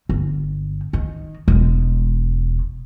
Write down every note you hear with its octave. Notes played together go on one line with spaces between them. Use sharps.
G1
D#3
E1 G#3